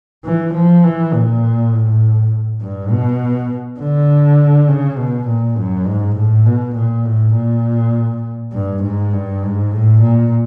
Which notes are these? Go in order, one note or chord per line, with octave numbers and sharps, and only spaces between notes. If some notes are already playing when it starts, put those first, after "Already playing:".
E3
F3
E3
A#2
A2
G2
B2
D3
C#3
B2
A#2
F#2
G#2
A2
B2
A#2
A2
A#2
G2
G#2
G2
G#2
A2
A#2